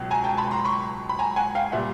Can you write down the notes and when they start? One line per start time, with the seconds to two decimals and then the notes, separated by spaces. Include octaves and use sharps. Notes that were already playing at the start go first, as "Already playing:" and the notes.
Already playing: C#2 B2 F#3
0.11 G#5 A#5
0.24 G5 A5
0.37 A5 B5
0.51 A#5 C6
0.64 B5 C#6
1.09 B5
1.19 G#5 A#5
1.36 F#5 G#5
1.55 F5 G5
1.72 A#2 G3 E5 F#5